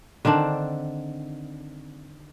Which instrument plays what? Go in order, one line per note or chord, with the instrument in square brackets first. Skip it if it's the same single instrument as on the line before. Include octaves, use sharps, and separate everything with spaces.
[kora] D3 D#3 C4 D4